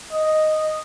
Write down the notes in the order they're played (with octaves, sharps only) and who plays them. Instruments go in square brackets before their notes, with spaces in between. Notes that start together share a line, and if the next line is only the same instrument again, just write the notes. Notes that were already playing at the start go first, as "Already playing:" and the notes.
[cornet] D#5